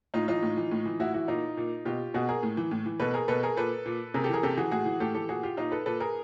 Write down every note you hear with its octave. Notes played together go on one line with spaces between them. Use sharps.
A2 D#4 F4
E3 D#4 F4
A2
E3
A2
E3
A2 E4 F#4
E3 E4 F#4
A#2 D#4 F4
A#2
B2 F4 G4
B2 F#4 G#4
G#4 A#4
A2
E3
A2
E3
B2 A4 B4
G#4 A#4
B2 A4 B4
G#4 A#4
A#2 A4 B4
A#2
C3 G#4 A#4
G4 A4
E3 G#4 A#4
C3 G4 A4
E3 F#4 G#4
A2 F#4 G#4
E3
A2 G4 A4
E3 G4 A4
A#2 F#4 G#4
F4 G4
A#2 D#4 F4
A4 B4
A#2 A4 B4
G#4 A#4